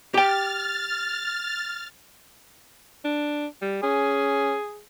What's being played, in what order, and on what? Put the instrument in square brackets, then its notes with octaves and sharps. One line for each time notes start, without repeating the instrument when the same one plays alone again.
[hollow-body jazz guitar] G4 G5 [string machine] F6 A6
[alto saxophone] D4
G3
[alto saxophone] C#4 [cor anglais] G#4